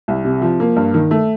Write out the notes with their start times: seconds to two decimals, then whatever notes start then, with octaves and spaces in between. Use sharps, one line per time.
0.08 C2
0.25 C3
0.42 F3
0.60 A#3
0.76 G2
0.94 D#3
1.11 A3